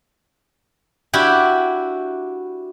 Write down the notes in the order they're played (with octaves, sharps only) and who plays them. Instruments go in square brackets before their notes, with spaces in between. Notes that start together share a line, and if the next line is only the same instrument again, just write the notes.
[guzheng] D4 E4 F#4 G4